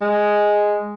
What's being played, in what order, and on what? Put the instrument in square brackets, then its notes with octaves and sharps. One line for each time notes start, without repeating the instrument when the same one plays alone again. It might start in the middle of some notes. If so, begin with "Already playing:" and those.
[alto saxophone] G#3